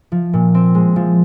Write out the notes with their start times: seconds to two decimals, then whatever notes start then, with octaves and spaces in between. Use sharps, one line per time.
0.12 F3
0.33 A#2
0.55 C4
0.75 G#3
0.96 F3